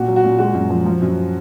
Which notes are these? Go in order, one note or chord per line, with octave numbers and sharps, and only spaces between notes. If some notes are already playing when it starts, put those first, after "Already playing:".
Already playing: A#2 F#4
F#3
F#4
A#2
G#3 F#4
F#2
F3
F3
F#2